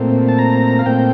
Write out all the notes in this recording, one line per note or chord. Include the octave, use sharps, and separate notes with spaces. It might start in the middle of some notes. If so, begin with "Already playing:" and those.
Already playing: A#2 A3 C4
A5
A#5
F5
A#2 A3 C4 G5